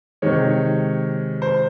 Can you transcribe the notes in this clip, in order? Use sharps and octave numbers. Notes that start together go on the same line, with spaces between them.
C3 D#3 G#3 C#5
C5